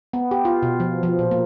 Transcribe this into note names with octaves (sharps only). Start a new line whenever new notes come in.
B3
G4
F4
B2
F3
F3
A#2
A#3